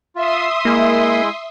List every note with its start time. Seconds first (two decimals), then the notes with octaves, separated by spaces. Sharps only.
0.15 F4 E5 C6 D#6
0.65 G#3 A#3 E4